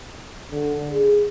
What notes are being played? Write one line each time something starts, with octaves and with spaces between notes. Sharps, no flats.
D3
G#4